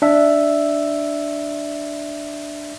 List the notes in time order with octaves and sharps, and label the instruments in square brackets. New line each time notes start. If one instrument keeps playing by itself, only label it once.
[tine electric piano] D4 E5